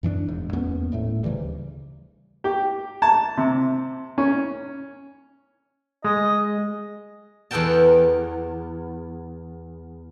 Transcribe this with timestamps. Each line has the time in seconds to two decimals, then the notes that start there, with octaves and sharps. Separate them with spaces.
0.03 F#2 E3 C4 D4
0.28 E1 G#2
0.53 E2 A#3 B3 C#4
0.92 D#1 A2 A3
1.24 D2 C#3 E3 G3
2.44 G4
3.02 A5
3.37 C3
4.18 C#4
6.04 G#3 D#5
7.51 E2 B3 A4 A#4 G5 A5